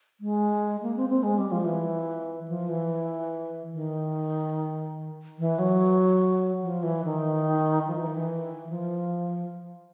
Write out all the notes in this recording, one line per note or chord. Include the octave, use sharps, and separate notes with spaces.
G#3
A#3
C4
C4
G#3
G3
F3
E3
F3
E3
D#3
E3
F#3
F3
E3
D#3
F3
E3
D#3
E3
F3